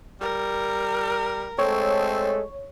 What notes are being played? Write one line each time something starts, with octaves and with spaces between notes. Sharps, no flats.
G3 A#4
G#3 A3 C4 A4 C#5